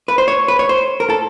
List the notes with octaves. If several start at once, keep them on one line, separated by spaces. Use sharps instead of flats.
B4
C5
C#5
B4
C#5
C5
A#4
A4